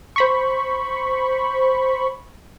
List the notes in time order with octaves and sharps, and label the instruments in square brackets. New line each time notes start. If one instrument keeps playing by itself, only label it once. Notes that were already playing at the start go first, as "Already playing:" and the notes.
[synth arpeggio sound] C5 B5 C#6